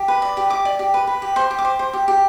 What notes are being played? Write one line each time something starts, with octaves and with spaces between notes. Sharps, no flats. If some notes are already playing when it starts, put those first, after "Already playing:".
Already playing: G4
B4
D5
G4
G4 D6
D5
G4
B4
B4
G4
C5 C6
G4
D6
C5
C5
G4
G4